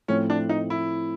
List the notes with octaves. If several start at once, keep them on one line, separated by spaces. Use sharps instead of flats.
A2 F3 A3 C4 C#4 E4
D4
D#4
E4